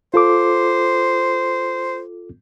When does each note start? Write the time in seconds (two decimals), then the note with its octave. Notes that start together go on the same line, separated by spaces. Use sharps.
0.14 F4 A4 C5 D6